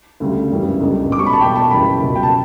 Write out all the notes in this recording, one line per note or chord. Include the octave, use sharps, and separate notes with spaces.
D2 C#3 G3
G1 F#2 E3 G3
C#2 C#3 G3
B1 B2 G3 D6
C#6
B5
A5
E1 E2 B2 G3 G5
A5
F#1 F#2 E3 G3 B5
C#2 B2 F#3
G5
A5